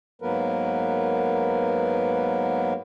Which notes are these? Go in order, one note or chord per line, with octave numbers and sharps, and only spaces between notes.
G#2 F#3 A#3 B3 A#4 B4